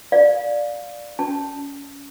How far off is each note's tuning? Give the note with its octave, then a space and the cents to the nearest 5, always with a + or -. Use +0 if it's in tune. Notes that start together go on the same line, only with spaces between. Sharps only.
D5 +0 F5 +15
C#4 +20 A5 +0